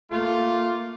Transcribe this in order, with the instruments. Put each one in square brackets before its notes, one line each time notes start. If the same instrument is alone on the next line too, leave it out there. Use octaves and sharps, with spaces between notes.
[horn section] A3 F4 [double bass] A#3